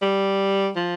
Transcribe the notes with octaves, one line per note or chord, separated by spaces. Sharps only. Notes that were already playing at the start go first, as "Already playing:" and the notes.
G3
F3